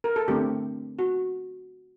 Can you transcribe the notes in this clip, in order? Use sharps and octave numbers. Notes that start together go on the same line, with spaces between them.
A#4
A4
D3 A3 C4 G4
F#4